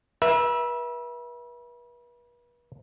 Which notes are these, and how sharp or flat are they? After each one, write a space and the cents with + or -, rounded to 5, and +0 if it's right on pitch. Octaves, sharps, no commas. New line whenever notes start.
B4 -40 E5 +0